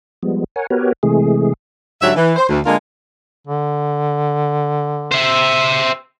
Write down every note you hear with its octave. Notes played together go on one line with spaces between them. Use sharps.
F3 G3 G#3 B3
A#4 C#5 F#5 G#5
B3 F#4 G4 A#4 B4 C#5
C3 E3 G#3 A3 G#4
G#2 D3 F#3 G3 E5
E3
C5
D2
D3 G#3 A#3 D4 F4 A#4
D3
C5 E5